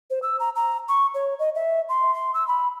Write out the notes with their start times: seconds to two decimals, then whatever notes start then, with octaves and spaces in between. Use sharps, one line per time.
0.10 C5
0.23 E6
0.40 A#5
0.56 A#5
0.89 C#6
1.15 C#5
1.39 D#5
1.55 E5
1.89 C6
2.14 C6
2.34 E6
2.48 B5